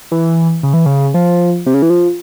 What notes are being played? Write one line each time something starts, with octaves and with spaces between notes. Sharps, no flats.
E3
C#3
E3
C#3
F3
C3
C#3
E3
F3